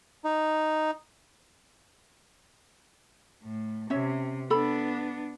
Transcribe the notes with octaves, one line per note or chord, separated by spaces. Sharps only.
D#4
A2
C3 C#4 C#5 E5
B3 D4 A4 B5